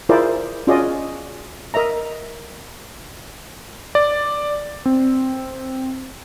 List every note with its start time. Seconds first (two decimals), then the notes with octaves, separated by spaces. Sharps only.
0.09 E4 F4 G#4 A#4 C5 D5
0.67 C#4 F4 F#4 G#4 D5 D#5
1.74 A#4 D#5 E5 A#5
3.95 D5
4.86 C4